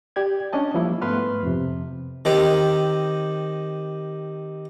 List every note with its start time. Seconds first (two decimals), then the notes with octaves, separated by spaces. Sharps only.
0.16 G4 D5 G#6
0.53 C#4 D4 D#5 A5
0.74 F3 G3 A#3 E4
1.02 G#2 A3 B3 B4 C6 F6
1.43 F2 C3
2.25 D#3 C4 G4 D#5 G5